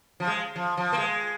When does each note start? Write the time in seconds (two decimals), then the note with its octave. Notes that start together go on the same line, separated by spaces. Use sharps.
0.20 F3
0.28 G#3
0.56 F3
0.77 F3
0.93 A#3
0.98 G#3